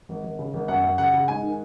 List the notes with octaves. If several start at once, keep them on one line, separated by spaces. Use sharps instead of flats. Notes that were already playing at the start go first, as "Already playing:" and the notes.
G#1
G#1
C#3
G#1
F#2 F#5
F#2
C#3 F#5
C#3
G#2 G#5
D#3